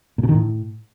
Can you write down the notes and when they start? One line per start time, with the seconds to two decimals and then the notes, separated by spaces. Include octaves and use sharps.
0.18 A#2
0.24 B2
0.29 D#3
0.34 A2